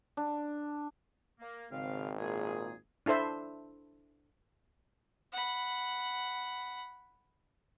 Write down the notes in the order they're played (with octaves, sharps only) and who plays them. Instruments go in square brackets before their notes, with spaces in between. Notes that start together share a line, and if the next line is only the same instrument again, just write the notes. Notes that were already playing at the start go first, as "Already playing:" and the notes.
[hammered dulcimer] D4
[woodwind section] A#3
[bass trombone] G#1 [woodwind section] C#3 F5 [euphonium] C4
[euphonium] A#2 [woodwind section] G#4
[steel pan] D4 E4 A4 C5 E5
[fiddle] F#5 B5